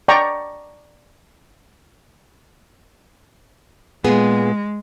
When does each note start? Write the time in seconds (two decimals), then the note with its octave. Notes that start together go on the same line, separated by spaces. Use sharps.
0.08 D5 G5 A#5 C#6
4.04 A#2 G#3 B3 G#4